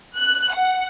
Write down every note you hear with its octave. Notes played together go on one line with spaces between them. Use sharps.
F#6
F#5